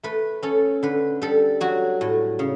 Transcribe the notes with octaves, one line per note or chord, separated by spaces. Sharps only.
A3 B4
C#4 A4
D3 B4
G3 A4
F#3 F#4
A2
C#3